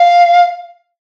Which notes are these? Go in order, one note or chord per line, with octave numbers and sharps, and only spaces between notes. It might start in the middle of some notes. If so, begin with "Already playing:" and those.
Already playing: F5